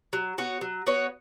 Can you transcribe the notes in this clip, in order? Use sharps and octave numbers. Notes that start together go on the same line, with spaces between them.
F#3
B3 F#4 C#5
F#3
B3 F#4 C#5